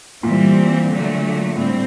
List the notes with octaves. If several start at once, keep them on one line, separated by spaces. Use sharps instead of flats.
A#2 E3 G3 C4
D3 F#3 A3
A2 G3 C4